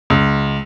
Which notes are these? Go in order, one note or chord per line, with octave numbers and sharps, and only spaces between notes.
C#2